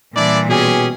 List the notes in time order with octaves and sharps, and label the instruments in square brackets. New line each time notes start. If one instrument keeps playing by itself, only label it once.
[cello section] A#2 E3 G3 [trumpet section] D4 E4 D5
[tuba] B2 [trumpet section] C#4 G4 G#4